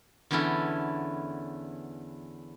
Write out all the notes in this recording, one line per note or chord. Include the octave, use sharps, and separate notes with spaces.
E2 D3 B3 C#4 E4 A4